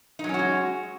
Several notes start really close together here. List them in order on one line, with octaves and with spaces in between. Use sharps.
D#4 F#3 C#4 F#4 G#3